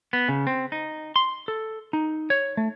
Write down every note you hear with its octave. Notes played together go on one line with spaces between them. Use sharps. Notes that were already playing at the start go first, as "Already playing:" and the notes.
B3
C#3
C4
D#4
C6
A4
D#4
C#5
A3